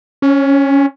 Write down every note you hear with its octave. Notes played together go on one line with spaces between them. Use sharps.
C#4